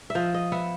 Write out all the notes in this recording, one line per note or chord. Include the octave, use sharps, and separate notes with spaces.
E5
F3 D#5
D#5
B3 E5